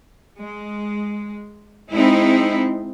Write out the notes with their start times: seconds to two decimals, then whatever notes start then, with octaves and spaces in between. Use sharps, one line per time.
0.40 G#3
1.92 G#3 C4 D#4 E4